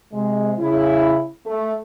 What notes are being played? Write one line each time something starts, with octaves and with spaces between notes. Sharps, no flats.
C3 G#3
C#3 E4
A3